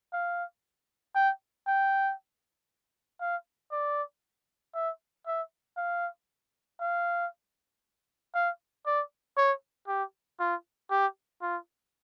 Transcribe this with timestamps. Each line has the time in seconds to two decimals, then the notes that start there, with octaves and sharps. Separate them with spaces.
0.13 F5
1.15 G5
1.67 G5
3.21 F5
3.72 D5
4.75 E5
5.27 E5
5.77 F5
6.81 F5
8.35 F5
8.86 D5
9.37 C#5
9.88 G4
10.40 F4
10.91 G4
11.42 F4